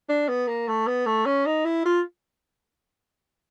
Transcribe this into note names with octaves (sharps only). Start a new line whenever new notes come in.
D4
B3
A#3
A3
B3
A3
C#4
D#4
E4
F4